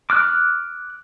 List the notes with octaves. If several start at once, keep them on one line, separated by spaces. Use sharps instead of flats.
D6 F6 F#6